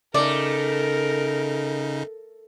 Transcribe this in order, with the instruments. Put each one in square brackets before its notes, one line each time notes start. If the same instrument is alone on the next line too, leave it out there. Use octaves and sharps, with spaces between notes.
[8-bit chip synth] C#3 D#4 [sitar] A3 [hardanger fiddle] A#4 [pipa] D5